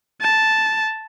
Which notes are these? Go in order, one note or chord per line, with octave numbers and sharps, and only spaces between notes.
A5